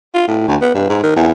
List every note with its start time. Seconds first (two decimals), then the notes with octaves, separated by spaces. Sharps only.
0.14 F4
0.28 A2
0.47 D2
0.61 B3
0.74 G2
0.89 G#2
1.03 D#3
1.16 E2